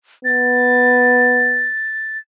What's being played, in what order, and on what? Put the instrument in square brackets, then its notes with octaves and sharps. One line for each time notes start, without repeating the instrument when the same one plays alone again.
[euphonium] B3 [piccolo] A6